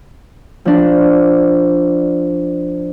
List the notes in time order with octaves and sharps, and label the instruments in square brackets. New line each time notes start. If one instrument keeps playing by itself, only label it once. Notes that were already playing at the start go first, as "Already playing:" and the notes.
[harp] F3 D4